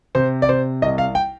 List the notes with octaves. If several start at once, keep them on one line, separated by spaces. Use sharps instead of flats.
C3 C5
D5
C3 C5
C2 D#5
F5
G5